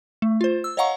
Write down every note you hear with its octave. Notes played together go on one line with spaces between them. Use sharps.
A3
F4 C5
E6
C#5 D#5 F5 F#5 A#5 C#6